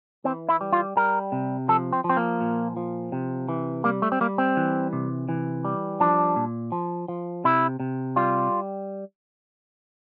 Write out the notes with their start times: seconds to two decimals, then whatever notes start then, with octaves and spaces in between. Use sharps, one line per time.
0.24 E3 C4
0.49 E4
0.61 G3
0.73 F4
0.97 G3 A#4
1.32 C3
1.68 F3 A4
1.93 C4
2.04 F3
2.09 C4
2.17 A#3
2.41 A#2
2.77 F3
3.12 C3
3.49 E3
3.84 G3 A#3
4.02 A3
4.12 C4
4.21 G3 A#3
4.38 C4
4.57 E3
4.93 C3
5.29 E3
5.65 G3
6.00 F3 D4
6.36 A#2
6.72 F3
7.08 F3
7.44 C3 E4
7.80 C3
8.16 G3 F4